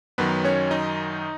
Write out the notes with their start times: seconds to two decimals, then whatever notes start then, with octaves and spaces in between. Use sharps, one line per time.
0.18 F#2 D#3 F#3 B3 B4
0.44 C#4 C#5
0.71 D#4 D#5